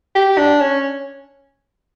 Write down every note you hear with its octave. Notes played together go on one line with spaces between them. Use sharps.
G4
D4
C#4